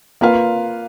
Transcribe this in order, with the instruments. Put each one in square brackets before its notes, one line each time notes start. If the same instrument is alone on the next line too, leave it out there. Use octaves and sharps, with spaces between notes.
[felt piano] A#3 F4 B4 F5